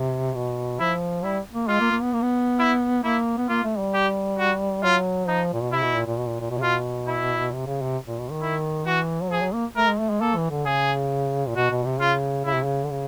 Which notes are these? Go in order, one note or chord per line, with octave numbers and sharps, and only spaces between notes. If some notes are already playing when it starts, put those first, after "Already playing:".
Already playing: C3
B2
F3 E4
G3 E4
A#3
G#3 F4
A#3
A#3
B3
A#3
B3
E4
A#3 E4
B3
A#3 F4
A3
G3
G4
F#4
F#3 F4
F3 D#4
A#2
B2
C3 E4
B2
A#2
A#2
B2
A#2
A#2
B2
C3
B2 F4
E4
C3
C#3
C3
A#2
B2
D#3
E4
E3 F#4
F#3
F3 G#4
F#3
A#3
A3 A#4
G#3
A3
G#3
A#3 A4
E3
D3
C#3 G#4
A#2
B2 F#4
B2
C3
C#3 F4
C#3 E4
C3
C#3
D3
C#3